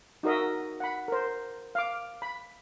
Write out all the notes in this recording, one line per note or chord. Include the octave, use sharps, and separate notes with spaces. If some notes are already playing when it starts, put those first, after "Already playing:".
D#4 F#4 A#4 D#5 E5
F#5 B5
A#4 C5
F5 D6
B5